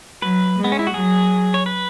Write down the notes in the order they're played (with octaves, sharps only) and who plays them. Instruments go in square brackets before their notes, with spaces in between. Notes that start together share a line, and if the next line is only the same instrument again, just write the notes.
[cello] F#3 [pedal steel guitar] B4
[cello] G#3
[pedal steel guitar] B3
C#4
E4
F#4
[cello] F#3 [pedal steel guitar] G#4
[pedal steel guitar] C#5
B4